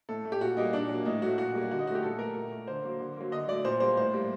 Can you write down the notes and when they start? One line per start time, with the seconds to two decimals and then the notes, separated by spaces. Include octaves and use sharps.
0.09 A2 A4
0.25 A3
0.32 G4
0.41 A#2 F#4
0.57 G3 A#3 D#4
0.73 A#2 D4
0.89 F#3 A#3
1.05 A2 D#4
1.22 F#3 A3 F#4
1.38 A#2 F#4
1.55 G3 A#3
1.71 D3 F#4
1.79 D#4
1.87 F#3 A3 F#4
1.95 G4
2.02 A#2 A4
2.19 A3 A#4
2.35 A#2
2.52 A3
2.68 D3 C5
2.84 F#3 A#3
3.01 D3
3.17 F#3 A#3
3.32 D3 D#5
3.48 F#3 A3 D5
3.65 A#2 C5
3.80 G3 A#3 C5
3.97 A2 C5
4.14 G3 A#3